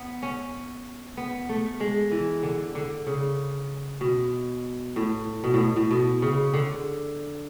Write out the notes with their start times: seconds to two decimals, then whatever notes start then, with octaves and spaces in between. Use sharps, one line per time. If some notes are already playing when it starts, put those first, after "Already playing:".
Already playing: B3
0.22 C#4
1.17 B3
1.49 A3
1.80 G#3
2.11 E3
2.43 D3
2.75 D3
3.07 C#3
4.01 B2
4.96 A2
5.44 B2
5.54 A2
5.76 A2
5.91 B2
6.22 C#3
6.54 D3